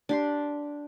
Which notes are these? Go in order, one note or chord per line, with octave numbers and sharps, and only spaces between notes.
D4 G4 C6